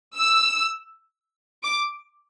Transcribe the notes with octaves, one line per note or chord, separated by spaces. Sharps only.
E6
D6